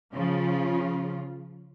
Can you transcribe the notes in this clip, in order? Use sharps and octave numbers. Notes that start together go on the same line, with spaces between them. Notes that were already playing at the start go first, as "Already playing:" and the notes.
C#3 F3 F4